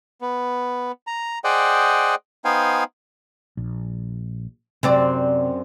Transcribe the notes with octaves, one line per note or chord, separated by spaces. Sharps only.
B3
A#5
G#4 C5 D5 D#5 F#5 G5
B3 D#4 C5 F5 G5 G#5
A#1
F#2 C3 C4 D5